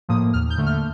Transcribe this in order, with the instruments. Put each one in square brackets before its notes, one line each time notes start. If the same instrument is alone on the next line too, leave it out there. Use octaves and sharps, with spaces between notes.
[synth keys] A2 F3 A#3 D#6
D#2 F6
G6
D3 A3
F6